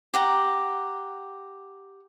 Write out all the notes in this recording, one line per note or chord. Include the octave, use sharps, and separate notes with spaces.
G4 F#5 A#5